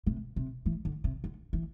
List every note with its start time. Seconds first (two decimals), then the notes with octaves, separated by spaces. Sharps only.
0.07 C3
0.36 C3
0.66 E3
0.85 D3
1.04 C3
1.24 D3
1.53 E3